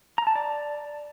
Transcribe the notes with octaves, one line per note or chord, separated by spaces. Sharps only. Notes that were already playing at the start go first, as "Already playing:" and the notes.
A#5
A5
D5